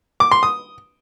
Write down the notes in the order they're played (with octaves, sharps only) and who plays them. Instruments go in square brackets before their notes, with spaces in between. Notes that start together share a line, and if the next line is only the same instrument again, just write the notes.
[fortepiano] D6
C6
D#6